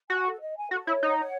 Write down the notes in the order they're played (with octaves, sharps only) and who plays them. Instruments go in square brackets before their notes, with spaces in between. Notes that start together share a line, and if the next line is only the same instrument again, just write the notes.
[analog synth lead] F#4 [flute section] G#5
[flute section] A4
D#5
G#5
[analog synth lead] F#4 [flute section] A4
[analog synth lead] E4 [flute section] C#5
[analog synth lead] D#4 [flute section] F#5
[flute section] C#5